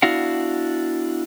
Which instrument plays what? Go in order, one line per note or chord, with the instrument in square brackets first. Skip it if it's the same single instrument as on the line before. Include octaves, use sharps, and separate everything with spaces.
[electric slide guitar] B3 D4 E4 F#4 F5 F#5